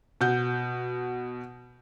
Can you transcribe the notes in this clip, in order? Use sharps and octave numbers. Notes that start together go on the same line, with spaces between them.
B2 F#5 G6